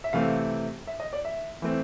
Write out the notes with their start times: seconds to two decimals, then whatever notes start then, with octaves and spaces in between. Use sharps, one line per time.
0.04 E5
0.13 C3 E3 A3 C4 F5
0.87 E5
1.00 D#5
1.13 D5
1.25 E5
1.62 E3 A3 C4